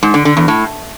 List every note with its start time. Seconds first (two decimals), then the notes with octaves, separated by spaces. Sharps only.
0.03 G#2
0.14 D3
0.25 D3
0.37 E2
0.48 A2